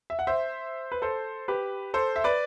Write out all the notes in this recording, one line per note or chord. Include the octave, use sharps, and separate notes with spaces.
E5
F#5
C5 E5
B4
A4 C5
G4 B4
A4 C5
E5
B4 D5